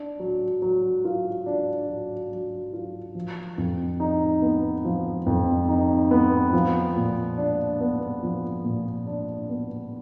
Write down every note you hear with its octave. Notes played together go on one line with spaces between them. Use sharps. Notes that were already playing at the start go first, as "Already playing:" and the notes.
Already playing: D4
F#3
F#3
F4
D4
F#3
F#3
F4
F3
F2
D#4
B3
F3
F2
D#4
B3
F3
A#2
D4
B3
F3
A#2
D4
B3